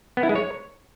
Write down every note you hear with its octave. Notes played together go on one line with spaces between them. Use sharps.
B3
E4
G#3
C#5